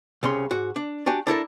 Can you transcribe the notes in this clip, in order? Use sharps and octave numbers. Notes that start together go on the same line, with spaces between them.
C2 C#3 C#4 C6
G#2 F#4
D4
D4 F#4 G4 G#5
D4 E4 A4 A#4